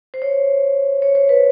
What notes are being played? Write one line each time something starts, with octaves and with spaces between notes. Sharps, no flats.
C5
C#5
C#5
C5
B4